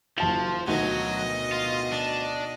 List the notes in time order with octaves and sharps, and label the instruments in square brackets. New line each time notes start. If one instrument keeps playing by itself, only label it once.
[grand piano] F#1 A5 F7 [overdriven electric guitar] F3
[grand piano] D2 D#3 [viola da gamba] B2 D#5 [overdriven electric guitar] F#3
[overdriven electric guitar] F4
D4